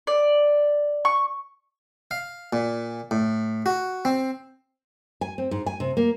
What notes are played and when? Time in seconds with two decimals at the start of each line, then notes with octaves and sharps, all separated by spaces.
0.07 D5
1.05 C#6
2.11 F5
2.53 A#2
3.11 A2
3.66 F#4
4.05 C4
5.21 G#5
5.38 C4
5.51 G#2
5.66 G#5
5.80 C3
5.97 A#3